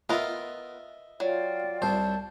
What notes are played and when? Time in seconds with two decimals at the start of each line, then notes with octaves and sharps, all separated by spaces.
0.09 B3 F4 A#4 D#5 E5
1.20 F#3 F4 D5 G5
1.82 C2 C5 A5